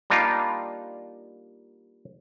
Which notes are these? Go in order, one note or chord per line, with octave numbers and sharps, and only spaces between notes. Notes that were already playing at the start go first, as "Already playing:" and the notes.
G3 A#3 D4 D#4 F4